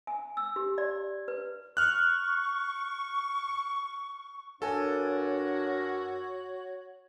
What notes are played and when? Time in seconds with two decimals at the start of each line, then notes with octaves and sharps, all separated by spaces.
0.07 G#5
0.37 E6
0.56 G4
0.78 D5
1.28 B4
1.77 C#6 F6 F#6
4.62 G2 D4 F#4 A4 A#4 C#5 G#5